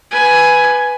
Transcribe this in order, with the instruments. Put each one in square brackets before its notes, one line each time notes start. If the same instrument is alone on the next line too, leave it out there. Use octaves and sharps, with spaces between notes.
[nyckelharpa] B4 G#5